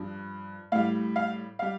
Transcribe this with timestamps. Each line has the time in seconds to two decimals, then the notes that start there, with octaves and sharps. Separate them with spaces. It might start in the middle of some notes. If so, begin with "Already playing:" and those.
Already playing: G2 F3
0.72 A2 G3 F5
1.16 F5
1.59 G3 F5